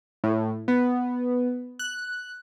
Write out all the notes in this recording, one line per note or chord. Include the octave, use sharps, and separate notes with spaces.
A2
B3
F#6